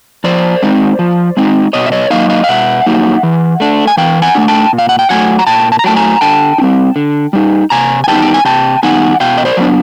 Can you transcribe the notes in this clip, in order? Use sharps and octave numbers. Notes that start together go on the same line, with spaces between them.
F3 C5 D5
G#3 C4 D#4
F3
G#3 C4 D#4
B2 C#5 D#5
E5
C#5 D#5
F#3 A#3 D#4 D#5 F5
D#5 F5
F5
B2 E5 F#5
F#3 A#3 D#4
E3
A3 D4
G#5
E3 F5 G5
F#5 G#5
A3 D4
G5 A5
A#2
F5
F#5
G5
F#3 A3 F#5 G#5
A#5
A#2 G5 A5
A5
A#5
F#3 A3 G5 A5
G#5 A#5
D3 G5 A5
D#4
G3 C4
D3
G3 C4 D#4
C3 G#5 A#5
G#5
D#3 G3 B3 D#4 G5 A5
G5
G#5
C3 G5 A5
D#3 G3 B3 D#4 F#5 G#5
B2 F5 G5
D#5
C5 D5
F#3 B3 D4